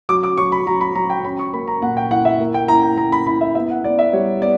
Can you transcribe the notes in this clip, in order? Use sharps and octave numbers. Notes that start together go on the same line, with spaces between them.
F#3 D6
D6
F#3 C#6
B5
F#3 A#5
B5
F#3 A#5
G5
C#4 B5
C#6
A#3 B5
A#5
A#2 F#5
G5
E4 F#5
E5
A#3
G5
E4 A#5
G5
A#3 A#5
B5
E4 B5
E5
B3 E5
F#5
B3 D5
E5
G3 C#5
B3 D5